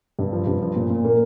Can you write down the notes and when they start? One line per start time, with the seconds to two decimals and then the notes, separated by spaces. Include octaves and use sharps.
0.19 G2
0.33 F3
0.47 G2
0.62 F3
0.76 A#2
0.90 A#2
1.04 A#3